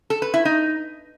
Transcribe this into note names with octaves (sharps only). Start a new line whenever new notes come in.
A4
B4
E4
D#4